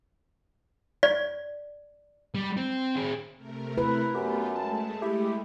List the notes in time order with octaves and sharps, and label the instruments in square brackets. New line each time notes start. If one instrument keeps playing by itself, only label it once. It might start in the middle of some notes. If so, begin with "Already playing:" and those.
[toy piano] D5
[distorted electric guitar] G3
C4
C4 G#4
[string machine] C3 A3 A#4
[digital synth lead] E4 [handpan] B4
[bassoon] F#2 [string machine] A3 B3 F4 [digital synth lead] G4
[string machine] G#3 A3 [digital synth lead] A5
[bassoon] E4 [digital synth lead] G4